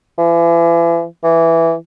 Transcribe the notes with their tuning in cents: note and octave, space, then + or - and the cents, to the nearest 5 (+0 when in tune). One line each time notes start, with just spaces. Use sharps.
E3 +40
E3 +5